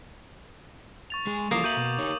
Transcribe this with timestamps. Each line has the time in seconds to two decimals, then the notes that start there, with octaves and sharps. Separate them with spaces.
1.10 C#6 A6 F7
1.27 G#3 G#4
1.51 E3 F3 G3 A#3 D6 D#6
1.64 F#4 E5 G6 D#7 F#7
1.77 B2
1.99 D#4 G4 C#5